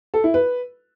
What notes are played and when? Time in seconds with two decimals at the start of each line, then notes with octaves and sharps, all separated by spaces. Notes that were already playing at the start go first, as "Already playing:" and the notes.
0.14 A4
0.24 E4
0.34 B4